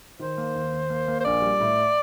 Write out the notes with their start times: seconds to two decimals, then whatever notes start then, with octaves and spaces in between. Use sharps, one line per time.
0.19 D#3 C5
0.37 A#3
0.54 D#2
0.72 D#2
0.90 A#3
1.08 A#3
1.20 C5
1.25 A#1 D5
1.42 G3
1.60 A2